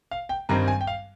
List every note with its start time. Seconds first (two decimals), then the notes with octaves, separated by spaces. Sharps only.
0.11 F5
0.29 G5
0.49 G2 D#3 G3 C4 A#5
0.68 G#5
0.81 G5
0.87 F5